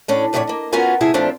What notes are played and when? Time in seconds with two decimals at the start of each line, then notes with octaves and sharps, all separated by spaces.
0.08 A2 C#4 D4
0.33 F2 A2 C#3 G#4 C#5 D5
0.47 A#3 D#5
0.72 B3 C#4 F4 F#4 A#4 G#5
1.00 G#2 C3 E4 G#4 E5 A5
1.14 A#2 F3 A3 C4 D4 F4